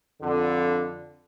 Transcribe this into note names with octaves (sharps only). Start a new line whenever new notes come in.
F2 D3